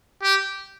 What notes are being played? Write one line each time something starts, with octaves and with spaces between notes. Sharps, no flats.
G4